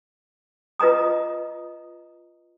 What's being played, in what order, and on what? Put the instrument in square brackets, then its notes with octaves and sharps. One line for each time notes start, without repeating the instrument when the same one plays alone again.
[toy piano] F4 B4 D#5 A#5 D#6